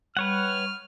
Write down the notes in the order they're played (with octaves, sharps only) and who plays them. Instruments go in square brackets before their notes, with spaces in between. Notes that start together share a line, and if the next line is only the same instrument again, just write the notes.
[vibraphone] G3 [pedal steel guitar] B4 C#5 F#5 [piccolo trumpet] F6